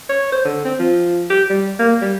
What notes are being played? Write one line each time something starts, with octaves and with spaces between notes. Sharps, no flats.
C#5
C5
D3
C4
F3
G4
G3
A#3
G3